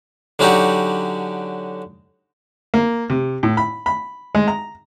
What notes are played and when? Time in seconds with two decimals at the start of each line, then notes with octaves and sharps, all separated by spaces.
0.39 D3 F#3 C#4 D#4 F#4 G4
2.74 A#3
3.10 C3
3.43 A2
3.57 B5
3.86 B5
4.35 G#3
4.48 A#5